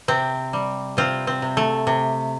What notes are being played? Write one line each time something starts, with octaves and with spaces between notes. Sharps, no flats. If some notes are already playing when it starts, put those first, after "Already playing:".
C3 C4
G3
C3 C4 F4
C4
C3
A3
C3